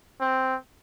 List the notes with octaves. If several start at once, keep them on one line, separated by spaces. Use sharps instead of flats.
C4